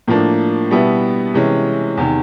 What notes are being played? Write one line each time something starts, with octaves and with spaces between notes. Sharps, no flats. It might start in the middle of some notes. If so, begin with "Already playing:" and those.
A2 F3 A#3 D4
B2 G3 B3 E4
C3 E3 G#3 C#4
E2 C3 D#3